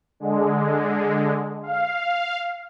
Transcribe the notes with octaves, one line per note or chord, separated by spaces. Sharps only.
D3 G#3
F5